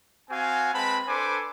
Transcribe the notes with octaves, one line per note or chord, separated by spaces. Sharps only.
C4 F#4 F5 G#5
G#3 C4 B4 A5 B5
D4 A4 B4 C5 G#5 D6